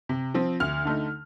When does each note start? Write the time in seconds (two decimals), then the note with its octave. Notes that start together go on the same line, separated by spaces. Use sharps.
0.09 C3
0.34 F3 C4
0.60 D2 F6
0.85 D3 A3 D#4